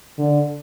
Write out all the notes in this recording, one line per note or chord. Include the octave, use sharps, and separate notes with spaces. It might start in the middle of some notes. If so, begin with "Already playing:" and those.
D3